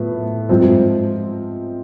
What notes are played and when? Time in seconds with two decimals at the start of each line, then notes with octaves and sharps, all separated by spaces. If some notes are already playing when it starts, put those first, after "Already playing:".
Already playing: A2 F3 B3
0.49 G#2 F3 C4